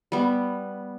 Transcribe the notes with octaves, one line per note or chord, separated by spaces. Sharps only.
G3 B3